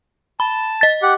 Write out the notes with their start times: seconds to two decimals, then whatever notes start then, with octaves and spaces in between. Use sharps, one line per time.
0.40 A5 B5
0.81 D#5 A6
1.02 G4 F#5